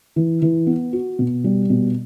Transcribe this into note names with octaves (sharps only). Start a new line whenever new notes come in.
E3
E3
B3
F#4
B2
G3
B2